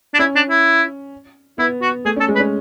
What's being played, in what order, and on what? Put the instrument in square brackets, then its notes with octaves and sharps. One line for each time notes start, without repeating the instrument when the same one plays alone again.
[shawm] D4
[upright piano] C#4 [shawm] E4
[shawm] D4
E4
[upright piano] B3 [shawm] E4
[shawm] F#4
[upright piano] A3 [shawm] G#4
[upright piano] C#4
[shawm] A4
[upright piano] G#3
[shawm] B4
[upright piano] C#4